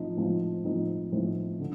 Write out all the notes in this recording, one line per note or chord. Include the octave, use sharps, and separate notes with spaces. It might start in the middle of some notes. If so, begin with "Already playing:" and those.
Already playing: A2 F3 C4 D#4
A2 F3 C4 D#4
A2 F3 C4 D#4
A2 F3 C4 D#4
D3